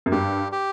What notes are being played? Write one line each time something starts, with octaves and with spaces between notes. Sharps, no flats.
F#2
G2 G4
G4